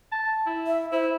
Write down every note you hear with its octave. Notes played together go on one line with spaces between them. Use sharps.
A5
E4
E5
E4 C5